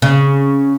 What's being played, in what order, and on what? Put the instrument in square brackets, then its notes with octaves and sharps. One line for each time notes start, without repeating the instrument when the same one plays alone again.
[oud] C#3